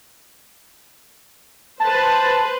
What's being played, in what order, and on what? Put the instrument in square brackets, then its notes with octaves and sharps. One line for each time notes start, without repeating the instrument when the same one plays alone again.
[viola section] B4 C5 [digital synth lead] A5